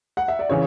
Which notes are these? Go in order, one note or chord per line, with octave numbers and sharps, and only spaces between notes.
F#5
E5
D5
C#3 E3 C#5